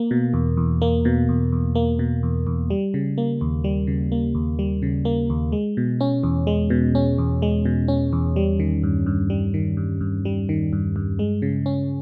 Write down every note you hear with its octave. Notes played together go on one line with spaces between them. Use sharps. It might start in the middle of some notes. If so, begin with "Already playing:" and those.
Already playing: A#3
B2
E2
E2
A#3
B2
E2
E2
A#3
B2
E2
E2
G3
C#3
A#3
D#2
G3
C#3
A#3
D#2
G3
C#3
A#3
D#2
G#3
B2
C#4
E2
G#3
B2
C#4
E2
G#3
B2
C#4
E2
G3
D#3
G2
G2
G3
D#3
G2
G2
G3
D#3
G2
G2
G#3
C#3
C#4